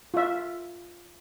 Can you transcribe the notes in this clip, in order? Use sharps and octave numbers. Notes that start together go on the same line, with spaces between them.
F4 E5